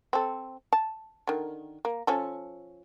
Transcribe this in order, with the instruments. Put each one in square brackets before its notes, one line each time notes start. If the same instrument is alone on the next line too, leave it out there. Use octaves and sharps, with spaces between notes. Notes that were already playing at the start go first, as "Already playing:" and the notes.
[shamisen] C4 A4
A5
D3 D#3
A#3
F3 C#4 A4